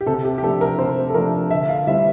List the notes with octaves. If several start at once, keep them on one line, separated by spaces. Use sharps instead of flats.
G4
C3 A4
G4
G4
F3 A3 D4 A4
A#4
C3 C5
A4
F3 A3 D4 A#4
D3 E5
F5
G3 C4 E4 E5